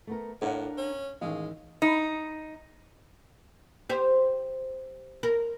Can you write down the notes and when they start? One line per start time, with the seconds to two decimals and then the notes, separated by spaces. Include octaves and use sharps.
0.07 A3 B3 A#4
0.42 A2 D4 A#4 C#5 F5 F#5
0.78 C#4
1.21 A1 D#3 G#3 F5
1.82 D#4
3.89 G4 C5
5.23 A#4